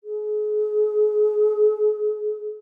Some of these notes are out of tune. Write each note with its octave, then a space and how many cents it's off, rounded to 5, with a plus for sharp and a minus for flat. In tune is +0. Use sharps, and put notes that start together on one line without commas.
G#4 +35